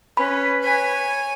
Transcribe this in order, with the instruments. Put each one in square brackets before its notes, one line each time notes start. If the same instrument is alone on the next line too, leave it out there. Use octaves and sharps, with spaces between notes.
[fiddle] C#4 [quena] B4 [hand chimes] B5
[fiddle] C#5 G#5